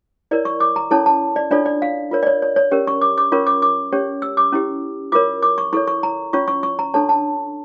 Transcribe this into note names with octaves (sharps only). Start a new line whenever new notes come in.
E4 A#4 C#5 D5
C#6
D6
A#5
C#4 E4 A4 C#5 A5
A5
D5
D4 F4 A4 C#5 D5
D5
F5
F4 A#4 C#5
D5
C#5
C#5
C#5
C#4 G4 A#4 C#5
C#6
D6
D6
C#4 F4 A#4 C#5 C#6
D6
D6
C#4 G4 C#5
E6
D6
C#4 E4 G4
F4 A#4 C#5 D6
D6
C#6
E4 A4 C#5 C#6
C#6
A#5
C#4 F4 C#5 C#6
C#6
C#6
A#5
D4 A4 C#5 A5
A5